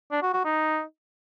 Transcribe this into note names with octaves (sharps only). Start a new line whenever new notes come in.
D4
F#4
F#4
D#4